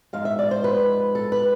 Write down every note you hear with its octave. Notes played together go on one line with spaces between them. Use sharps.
G#2 F3 G#3 F5
E5
D5
C5
B4
A4
B4